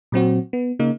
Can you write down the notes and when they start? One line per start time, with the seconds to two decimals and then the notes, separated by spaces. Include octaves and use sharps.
0.12 A#2 F#3 C4 F#4
0.53 B3
0.79 C#3 A#3 D#4